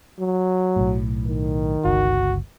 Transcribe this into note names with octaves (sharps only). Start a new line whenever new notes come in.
F#3
B1 A2
D#3
G1 C#2 F#4